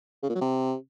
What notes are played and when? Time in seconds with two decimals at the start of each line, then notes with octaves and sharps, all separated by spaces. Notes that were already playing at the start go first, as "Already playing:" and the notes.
0.23 C#3
0.29 A#2
0.35 F#3
0.41 C3